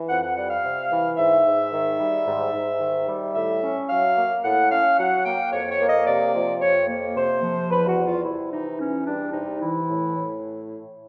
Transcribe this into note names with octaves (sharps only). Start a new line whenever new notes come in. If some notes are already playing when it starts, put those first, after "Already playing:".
Already playing: E3
F2 F#5
F#5
G3 F#5
F5
C3
E3
G#2 E5
G#2
D#3
G3
G#2
G#2
D#3
G3
A2 E5
C#4
F#3 F5
A#3
A2 F#5
C#4 F5
F#3 F#5
A#3 G5
F2 C#5
C#5
A#3
D#5
C3 D5
F3
F2 C#5
A#3
C3 C5
F3
E2 B4
F#4
G3
F4
C3 E4
E3 D#4
E2 C#4
G3 D4
C3 D#4
E3 E4
A2
A2